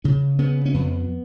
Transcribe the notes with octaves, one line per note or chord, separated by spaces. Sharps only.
C#3 C#4
C#3 B3
C#4
F2 B3